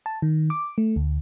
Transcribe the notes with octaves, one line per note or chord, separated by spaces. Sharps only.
A5
D#3
D6
A3
D2